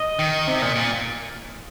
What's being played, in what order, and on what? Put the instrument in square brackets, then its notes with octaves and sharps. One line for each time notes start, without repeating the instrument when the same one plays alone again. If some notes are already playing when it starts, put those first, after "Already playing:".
Already playing: [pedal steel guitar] D#5
[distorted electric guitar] D#3
C3
A#2
A#2